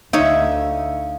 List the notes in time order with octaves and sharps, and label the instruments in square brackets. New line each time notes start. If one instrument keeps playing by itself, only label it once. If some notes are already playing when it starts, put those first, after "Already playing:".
[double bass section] D2 [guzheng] D#4 C#5 [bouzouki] E5 [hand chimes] F5